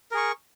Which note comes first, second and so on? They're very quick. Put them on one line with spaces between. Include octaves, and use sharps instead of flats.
A#4 G#4 C#6